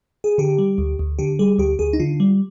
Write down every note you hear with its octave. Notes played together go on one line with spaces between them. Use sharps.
G#4
D3 G4
G3
D2
D2
D3 G4
G3 G#4
D2 G4
D2 G#4
D#4
D3 F4
G3